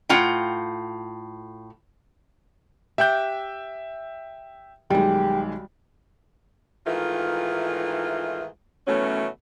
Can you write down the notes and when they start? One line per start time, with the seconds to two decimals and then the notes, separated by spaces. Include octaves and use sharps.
0.09 A2 F4 F#5 G5
2.98 G4 E5 F#5 G5 G6
4.91 B1 D#3 G3 G#3 G4
6.87 G#2 D#3 E3 A3 F4
8.87 B2 D#3 E3 F#3 A3 C#4